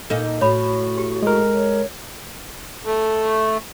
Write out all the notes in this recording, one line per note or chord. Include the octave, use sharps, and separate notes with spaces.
A#2 D#4 A4
A2 F#4 C#5 B5
G4
G#3 A#4
C#5
A3